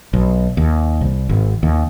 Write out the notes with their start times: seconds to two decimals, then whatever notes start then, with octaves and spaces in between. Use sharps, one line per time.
0.13 B1
0.57 D#2
1.01 C2
1.29 G#1
1.63 D#2